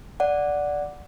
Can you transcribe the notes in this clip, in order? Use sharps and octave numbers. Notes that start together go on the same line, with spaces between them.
D5 F#5